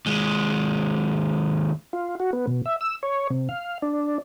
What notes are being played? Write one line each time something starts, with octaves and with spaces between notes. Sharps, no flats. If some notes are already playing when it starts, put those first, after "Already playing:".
D#2 G#3
F4
F#4
B3
B2
E5
E6
C#5
C3
F5
D4